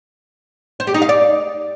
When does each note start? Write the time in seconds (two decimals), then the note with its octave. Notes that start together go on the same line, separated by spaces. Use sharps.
0.80 C5
0.87 G4
0.94 D#4
1.02 F5
1.09 D5